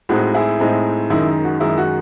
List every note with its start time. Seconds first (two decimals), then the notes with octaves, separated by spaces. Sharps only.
0.09 A2 G#3 C4 D#4 F#4
0.34 E4 G#4
0.60 A2 G#3 C4 D#4
1.10 F#2 D#3 G#3 D#4 E4
1.44 F#4
1.60 F#2 D#3 G#3 D#4 E4
1.78 F#4